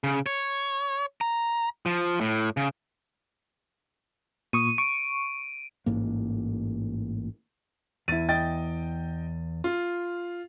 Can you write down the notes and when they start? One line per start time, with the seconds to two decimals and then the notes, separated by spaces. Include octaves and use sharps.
0.04 C#3
0.26 C#5
1.21 A#5
1.86 F3
2.21 A2
2.57 C#3
4.53 A#2 C#6 D#6 D#7
4.78 C#6 D7
5.86 A1 G#2 A#3
8.08 E2 E4 A6 D#7
8.29 D#5 G5 A6
9.64 F4